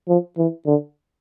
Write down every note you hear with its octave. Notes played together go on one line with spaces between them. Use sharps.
F3
E3
D3